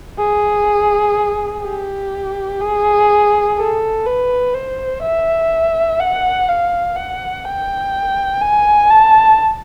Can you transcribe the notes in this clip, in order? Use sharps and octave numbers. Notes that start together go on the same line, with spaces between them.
G#4
G4
G#4
A4
B4
C5
E5
F#5
F5
F#5
G5
G#5
A5